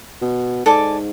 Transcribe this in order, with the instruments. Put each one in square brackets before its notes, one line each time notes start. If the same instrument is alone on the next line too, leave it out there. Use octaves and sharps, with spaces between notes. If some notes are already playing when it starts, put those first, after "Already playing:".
[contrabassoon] B2
[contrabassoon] G#2 [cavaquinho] A4 D5 G#5 D6